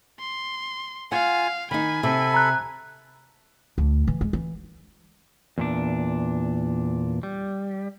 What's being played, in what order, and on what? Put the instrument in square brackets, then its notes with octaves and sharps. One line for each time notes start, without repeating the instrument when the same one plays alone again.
[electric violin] C6
[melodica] F4 G#5 [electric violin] F5 [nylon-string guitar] F#5
[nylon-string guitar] D#3 D#4 [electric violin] G#5 [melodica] B5
[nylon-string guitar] C3 [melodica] A4 B5
[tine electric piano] A#5 F#6
[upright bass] D2
E3
G#3
E3
[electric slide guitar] E2 A#2 D4
G3